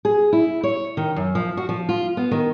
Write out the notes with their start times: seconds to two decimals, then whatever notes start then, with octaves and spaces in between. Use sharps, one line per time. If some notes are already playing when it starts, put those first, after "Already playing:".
0.05 G#4
0.33 E4
0.63 C#5
0.97 D#3
1.16 F#2
1.35 F3
1.57 F#4
1.69 F3
1.89 F4
2.17 B3
2.31 D#3